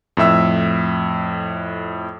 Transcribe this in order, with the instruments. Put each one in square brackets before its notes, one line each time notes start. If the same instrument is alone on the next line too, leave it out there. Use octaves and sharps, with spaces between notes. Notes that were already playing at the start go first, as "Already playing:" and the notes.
[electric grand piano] F2 A2 E5 E6